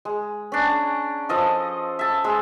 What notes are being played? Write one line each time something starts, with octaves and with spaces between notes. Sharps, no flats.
G#3
C#4 D4
A#5
F3 A4 D#5 F5
E5 A5
G#3 E6